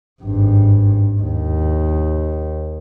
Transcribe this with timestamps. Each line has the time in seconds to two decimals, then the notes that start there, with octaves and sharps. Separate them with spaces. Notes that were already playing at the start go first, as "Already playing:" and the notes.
0.23 G#1 G2
1.21 D#2